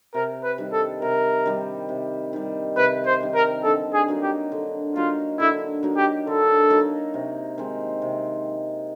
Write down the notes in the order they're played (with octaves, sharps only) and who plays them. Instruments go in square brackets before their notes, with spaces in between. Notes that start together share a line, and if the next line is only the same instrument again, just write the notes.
[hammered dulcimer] C3 [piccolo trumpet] A#4
[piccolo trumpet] B4
[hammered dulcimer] D#3 G3
[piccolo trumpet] A4
[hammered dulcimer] C3 [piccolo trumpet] A#4
[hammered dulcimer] D#3 G3
C3
D#3 G3
[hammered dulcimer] C3 [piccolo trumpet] B4
[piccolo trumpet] C5
[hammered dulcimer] D#3 G3
[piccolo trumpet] A#4
[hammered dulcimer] D3 [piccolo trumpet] A4
[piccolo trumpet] G#4
[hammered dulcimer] F#3 A#3 D#4
[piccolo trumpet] G4
[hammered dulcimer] D3
[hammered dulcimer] F#3 A#3 D#4 [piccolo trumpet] F4
[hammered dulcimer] D3 [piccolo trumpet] E4
[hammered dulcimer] F#3 A#3 D#4
[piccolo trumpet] G4
[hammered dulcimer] D3 [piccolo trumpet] A4
[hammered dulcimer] F#3 A#3 D#4
C3
D#3 G#3 C4
C3